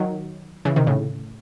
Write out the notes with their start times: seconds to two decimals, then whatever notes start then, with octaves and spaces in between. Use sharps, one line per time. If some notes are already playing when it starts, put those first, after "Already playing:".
Already playing: D#3 F#3
0.65 C#3 E3
0.76 C3 D#3
0.87 A2 C#3